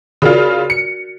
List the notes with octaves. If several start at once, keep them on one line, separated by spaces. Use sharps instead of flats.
C#3 F4 F#4 A#4 D5
C#7